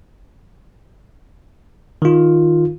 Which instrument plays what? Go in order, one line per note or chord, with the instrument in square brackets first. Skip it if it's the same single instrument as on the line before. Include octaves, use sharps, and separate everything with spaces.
[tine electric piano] D#3 F4